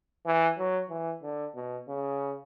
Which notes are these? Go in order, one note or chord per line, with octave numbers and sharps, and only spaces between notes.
E3
F#3
E3
D3
B2
C#3